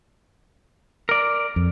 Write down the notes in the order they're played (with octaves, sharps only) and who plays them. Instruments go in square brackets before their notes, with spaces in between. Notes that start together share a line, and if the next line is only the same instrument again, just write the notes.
[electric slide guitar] A#4 D5
[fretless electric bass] F2